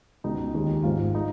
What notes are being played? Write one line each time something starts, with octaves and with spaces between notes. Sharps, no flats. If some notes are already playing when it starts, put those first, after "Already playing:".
C#2 B2 G#3 D#4
D#2 D#3 G#3
G#1 G#2 F3 G#3 F4
F3 G#3 D#4